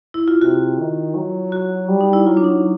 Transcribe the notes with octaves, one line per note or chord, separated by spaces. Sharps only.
E4
F4
C3 F#4
D#3
F#3
F#4
G3
D#4
E4
F#3 F4
D4
D#4